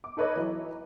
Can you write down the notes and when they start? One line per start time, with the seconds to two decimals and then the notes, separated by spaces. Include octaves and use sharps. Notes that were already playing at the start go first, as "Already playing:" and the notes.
0.04 D6
0.17 D#4 A4 B4 C#5 D#5
0.36 E3 F#3